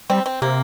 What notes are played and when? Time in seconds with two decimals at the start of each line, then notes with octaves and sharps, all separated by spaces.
0.10 G3 C4
0.26 C4
0.42 C3 A#3